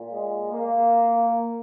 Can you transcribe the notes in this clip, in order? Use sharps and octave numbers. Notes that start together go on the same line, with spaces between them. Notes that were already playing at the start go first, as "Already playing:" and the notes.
Already playing: A#2
G#3
A#3